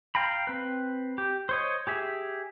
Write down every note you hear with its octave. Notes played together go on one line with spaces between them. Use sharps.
F5 G5 A#5 B5
C4 B4
G4
C5 C#5 D#5
G4 G#4 E5